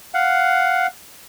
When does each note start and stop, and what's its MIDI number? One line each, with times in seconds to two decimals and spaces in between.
0.14 0.87 77
0.14 0.87 78